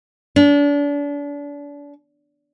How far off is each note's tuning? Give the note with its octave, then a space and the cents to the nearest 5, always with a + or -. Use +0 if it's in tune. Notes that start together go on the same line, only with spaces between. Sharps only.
D4 -35